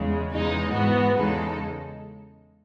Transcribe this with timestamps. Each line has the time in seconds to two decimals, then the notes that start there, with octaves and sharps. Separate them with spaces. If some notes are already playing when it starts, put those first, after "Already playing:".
Already playing: E2 C#3 G#3
0.30 E2 C#3 G#3 D#4
0.73 G#2 E3 B3 F#4
1.15 E2 C#3 G#3 D#4 A4